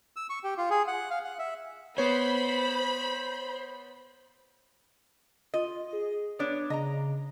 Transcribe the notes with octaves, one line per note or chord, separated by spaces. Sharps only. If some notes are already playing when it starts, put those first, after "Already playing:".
E6
C#6
G4
F4
G#4
F#5
F5
F#5
E5
B3 C5 C#5 B5
F4 D#5
G#4
B3 D4 C#5
C#3 D#5 A#5